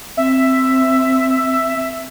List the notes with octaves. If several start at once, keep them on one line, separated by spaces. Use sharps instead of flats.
C4 E5